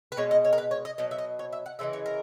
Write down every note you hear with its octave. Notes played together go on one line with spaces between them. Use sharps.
B4
B2 G#3 C#5
D#5
C#5
A#4
B4
C#5
D#5
B2 F#3 D#5
E5
D#5
C#5
E5
F#5
C#3 E3 G#3 E5
C#5
A#4